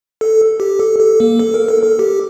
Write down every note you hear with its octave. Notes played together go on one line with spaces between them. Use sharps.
A4
G4
A4
A4
A#3
A4
A#4
A4
A4
G4